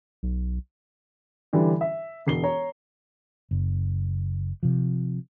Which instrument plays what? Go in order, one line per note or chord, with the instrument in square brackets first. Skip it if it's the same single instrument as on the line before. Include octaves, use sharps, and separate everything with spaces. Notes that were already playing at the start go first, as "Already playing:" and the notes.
[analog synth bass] B1
[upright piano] D3 E3 G3 D4
E5
E1 C7 G7
C#5 A#5
[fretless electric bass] F#1
C3 F3